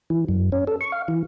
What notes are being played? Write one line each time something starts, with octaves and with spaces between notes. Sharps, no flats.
E3
F#2
C#4
A4
C#6
F5
E3